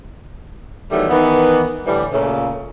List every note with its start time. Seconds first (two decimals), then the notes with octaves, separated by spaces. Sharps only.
0.91 D#3 E3 F#3 G3 A3 B3
1.10 D#3 E3 B3
1.85 A2 D3 E3 G3
2.12 A#2 C#3 A3